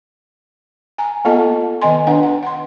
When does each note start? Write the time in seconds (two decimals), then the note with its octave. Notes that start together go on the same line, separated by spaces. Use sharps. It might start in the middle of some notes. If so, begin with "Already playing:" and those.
0.98 G#5 A#5
1.25 A#3 B3 F4 A4 D#5 A5
1.82 D#3 B3 D#5 G#5 C6
2.07 D4 B4 F#5 G5
2.23 F#5
2.43 F#5 C6